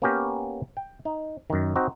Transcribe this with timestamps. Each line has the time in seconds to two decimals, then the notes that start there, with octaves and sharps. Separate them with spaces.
0.02 A#3 B3 C#4 G4 A#4
0.77 G5
1.05 D#4
1.50 F#2 D#3
1.76 C4 D#4 F#4 D#5